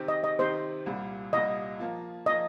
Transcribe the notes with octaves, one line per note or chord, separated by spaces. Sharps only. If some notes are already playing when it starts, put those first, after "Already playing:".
Already playing: C3 D#3 C4 G4
D#5
D#5
C3 D#3 C4 G4 C5
C2 A#2 G3
C2 A#2 G3 D#5
F3 A#3 F4
F3 A#3 F4 D#5